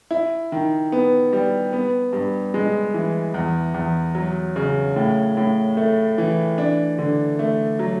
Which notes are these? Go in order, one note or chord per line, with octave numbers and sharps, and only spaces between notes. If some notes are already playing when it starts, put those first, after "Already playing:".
E4
D#3
B3
G3
B3
G2
G#3
E3
E2
E2
F#3
C#3
A2
A2
A3
E3
D4
D3
A3
F#3